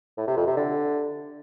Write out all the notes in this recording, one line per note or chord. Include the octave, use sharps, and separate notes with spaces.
A2
C3
F2
C3
D3